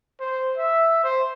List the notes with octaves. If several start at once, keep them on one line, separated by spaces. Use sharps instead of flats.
C5
E5
C5